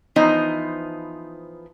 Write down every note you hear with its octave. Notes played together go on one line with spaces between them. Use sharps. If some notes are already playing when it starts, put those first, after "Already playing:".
E3 F3 B3 D#4 C5